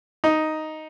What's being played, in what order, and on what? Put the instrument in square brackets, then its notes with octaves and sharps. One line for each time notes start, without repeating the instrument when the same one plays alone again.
[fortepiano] D#4